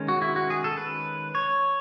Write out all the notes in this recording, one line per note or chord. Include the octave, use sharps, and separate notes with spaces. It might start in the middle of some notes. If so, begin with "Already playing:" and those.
Already playing: D#3 G#3 C#4
F#4
E4
F#4
G#4
A4
B4
C#5